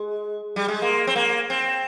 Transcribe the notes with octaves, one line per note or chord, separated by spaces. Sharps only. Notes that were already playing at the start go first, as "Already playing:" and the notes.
Already playing: G#3
G3
G#3
A#3
C4
A#3
C4